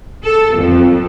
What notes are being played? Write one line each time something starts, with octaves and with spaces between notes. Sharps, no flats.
A4
F2